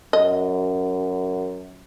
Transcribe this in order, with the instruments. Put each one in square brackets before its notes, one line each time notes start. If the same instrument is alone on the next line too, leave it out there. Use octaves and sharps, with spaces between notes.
[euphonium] F#2 [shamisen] D#5